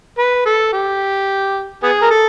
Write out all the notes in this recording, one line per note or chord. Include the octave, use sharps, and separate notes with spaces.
B4
A4
G4
B3 G#4
A#4
A4